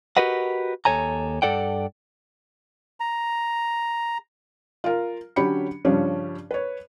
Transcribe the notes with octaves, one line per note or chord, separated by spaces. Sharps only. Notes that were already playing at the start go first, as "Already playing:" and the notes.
F#4 G4 A#4 B4 D#5 F#5
D#2 B2 A4 C#5 G#5 A#5
G2 G#3 A4 D5 F#5 G5
A#5
F4 A#4
D3 F#3 C#4 G4 B5 C#7
G2 C#3 F3 G3 C#4 D4
B4 C#5